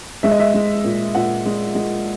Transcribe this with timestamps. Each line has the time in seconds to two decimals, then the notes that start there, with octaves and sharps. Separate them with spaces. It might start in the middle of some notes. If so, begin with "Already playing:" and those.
0.23 G#3 E5
0.31 D#5
0.40 E5
0.54 G#3
0.84 A#2
1.15 A#2 F#5
1.46 G#3
1.75 G#3